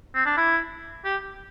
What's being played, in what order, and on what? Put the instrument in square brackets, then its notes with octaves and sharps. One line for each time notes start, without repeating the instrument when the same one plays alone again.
[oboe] C4
D4
E4
G4